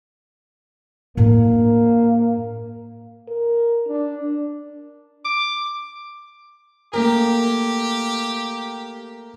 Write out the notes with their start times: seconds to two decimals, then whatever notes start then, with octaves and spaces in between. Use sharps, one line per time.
1.17 A2 A#3 D4
3.28 A#4
3.88 D4
5.25 D6
6.93 A3 A#3 G4 A#4